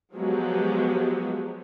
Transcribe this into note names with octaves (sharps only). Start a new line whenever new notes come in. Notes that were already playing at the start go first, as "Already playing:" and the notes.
F3 F#3 G#3 B3 G4